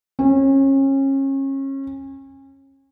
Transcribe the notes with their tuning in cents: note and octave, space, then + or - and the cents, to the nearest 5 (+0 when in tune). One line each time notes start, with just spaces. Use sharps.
C#4 -30